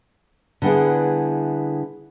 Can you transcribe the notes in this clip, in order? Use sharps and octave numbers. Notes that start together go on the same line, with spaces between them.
D3 G3 B3 E4 G#4